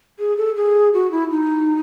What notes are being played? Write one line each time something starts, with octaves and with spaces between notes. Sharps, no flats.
G#4
A4
G#4
F#4
E4
D#4